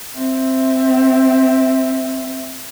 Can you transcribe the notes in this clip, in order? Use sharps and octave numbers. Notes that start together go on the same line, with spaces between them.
C4 E5